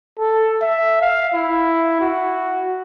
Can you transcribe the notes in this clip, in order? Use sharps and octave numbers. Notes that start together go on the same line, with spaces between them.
A4
E5
F5
E4
F#4